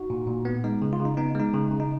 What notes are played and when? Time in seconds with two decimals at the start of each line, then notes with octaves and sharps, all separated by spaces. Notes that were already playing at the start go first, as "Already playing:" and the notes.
Already playing: D#4 F#4
0.10 A#2
0.28 A#2
0.45 B3
0.64 G#3 D#4
0.82 C#3
0.93 F4
0.99 C#3
1.05 D#4
1.17 B3 D#4
1.35 G#3 D#4
1.54 C#3
1.71 C#3
1.80 D#4